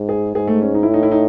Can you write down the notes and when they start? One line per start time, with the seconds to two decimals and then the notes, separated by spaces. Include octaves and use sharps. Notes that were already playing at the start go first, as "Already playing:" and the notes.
Already playing: G#2
0.09 G#4
0.35 G#2 G#4
0.47 A3
0.62 C#4
0.74 D#4
0.83 E4
0.88 A2
0.94 D#4
1.03 E4
1.11 D#4